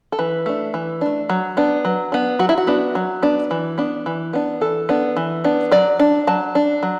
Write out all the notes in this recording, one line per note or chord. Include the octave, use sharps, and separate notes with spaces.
A4
E3 B4
A3 D4
E3
A3 D4
F#3
B3 D4
F#3
B3 D4
F#3 F#4
E4
F#4
B3 D4
F#3
B3 D4
E3
B3 D4
E3
B3 D4
E3 A4
B3 D4
E3
B3 D4
F#3 D5
D4
F#3 A5
D4
F#3